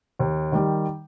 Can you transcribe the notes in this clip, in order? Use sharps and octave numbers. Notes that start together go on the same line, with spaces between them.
D#2
D#3 G3